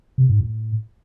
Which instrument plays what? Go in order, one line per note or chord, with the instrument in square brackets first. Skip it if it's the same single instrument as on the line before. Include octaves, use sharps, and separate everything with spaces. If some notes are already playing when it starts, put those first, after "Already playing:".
[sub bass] C3
G#2
A2